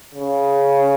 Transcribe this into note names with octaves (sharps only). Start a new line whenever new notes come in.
C#3